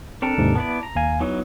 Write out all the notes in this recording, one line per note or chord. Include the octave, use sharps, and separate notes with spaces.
C4 D4 A4 A#4
D#2 G#2 C3
B3 E4 D5 A5
A#5
D#2 F5 G#5
E3 F#3 B3 D#4